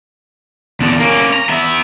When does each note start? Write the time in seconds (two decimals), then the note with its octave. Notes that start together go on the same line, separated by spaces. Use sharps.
0.81 E2 D3
1.00 A#3 C#4
1.34 A#5
1.49 B3 E5